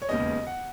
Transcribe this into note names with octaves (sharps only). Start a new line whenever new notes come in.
C#5
E1 D#2 C#3 G#3 B3 D#5
F#5